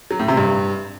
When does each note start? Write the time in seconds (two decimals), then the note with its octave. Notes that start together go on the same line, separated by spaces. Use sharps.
0.11 F#3
0.19 A2
0.28 C3
0.37 G2